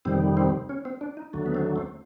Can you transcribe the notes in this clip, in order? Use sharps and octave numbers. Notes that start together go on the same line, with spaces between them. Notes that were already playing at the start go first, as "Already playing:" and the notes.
F2 C3 D#3 G3 C4
C4
C#4
C4
D4
D#4
D#2 D3 F#3 A3
B3
C4
C4